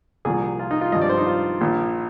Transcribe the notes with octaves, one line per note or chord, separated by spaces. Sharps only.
C2 A#2 F3 G#4
F4
D#4
F4
G#1 G2 F3 D#5
D5
C5
D#4
F4
A#1 A#2 F3